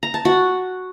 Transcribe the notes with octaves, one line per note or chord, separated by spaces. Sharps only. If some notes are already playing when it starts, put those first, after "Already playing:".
A#5
A5
F#4